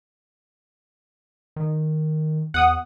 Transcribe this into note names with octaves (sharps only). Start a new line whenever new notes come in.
D#3
E2 F#5 D#6